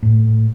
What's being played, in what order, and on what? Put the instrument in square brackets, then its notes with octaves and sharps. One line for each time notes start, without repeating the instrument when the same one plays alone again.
[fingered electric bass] A2